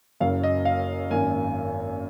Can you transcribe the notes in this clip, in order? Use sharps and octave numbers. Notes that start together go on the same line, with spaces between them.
F#1 F#2 C#3 F#3 A#3 F5
D#5
F5
G#1 F#2 D#3 A#3 G#5